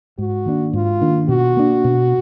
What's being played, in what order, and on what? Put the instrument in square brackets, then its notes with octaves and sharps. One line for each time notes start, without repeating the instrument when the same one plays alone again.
[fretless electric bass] G#2 [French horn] F#4
[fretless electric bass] D#3 A#3 D4
[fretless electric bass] G#2 [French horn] F4
[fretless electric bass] D#3 A#3 D4
[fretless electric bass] B2 [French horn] F#4
[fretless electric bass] A#3 D4
B2